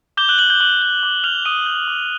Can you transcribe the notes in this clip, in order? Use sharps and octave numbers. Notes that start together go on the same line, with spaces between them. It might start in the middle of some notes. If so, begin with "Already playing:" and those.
D6 G6 G7
F#6 F#7
F#6 G6 F#7
G6 G7
D6 F#6 F#7
G6
D6
F6 G6 F7
D6 D#6 D#7
G6
D6